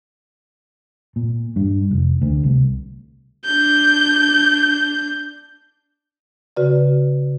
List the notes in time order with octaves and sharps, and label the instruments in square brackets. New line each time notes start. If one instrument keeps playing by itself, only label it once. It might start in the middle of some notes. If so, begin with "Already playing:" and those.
[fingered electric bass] A#2
G2
F1
D2
C2
[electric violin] D4 G6
[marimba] C#3 F#4 B4 D5